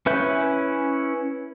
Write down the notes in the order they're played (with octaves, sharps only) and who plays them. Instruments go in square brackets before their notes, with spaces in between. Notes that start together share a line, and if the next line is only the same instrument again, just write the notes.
[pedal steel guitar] C#4 E4 B4 E5 G6